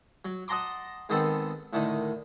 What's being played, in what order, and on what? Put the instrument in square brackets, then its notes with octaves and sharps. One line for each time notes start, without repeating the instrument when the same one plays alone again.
[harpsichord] F#3
D#5 F#5 A5 A#5 C6 D6
G#2 D#3 B3 C4 A4 A5
A2 D3 D#3